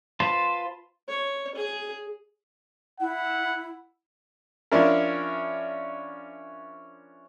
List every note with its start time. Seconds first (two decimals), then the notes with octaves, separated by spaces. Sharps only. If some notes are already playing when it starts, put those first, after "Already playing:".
0.20 F4 B4 C5 A5
1.08 C#5
1.54 G#4
3.00 E4 F#5
4.72 F3 C#4 D4 E4 A#4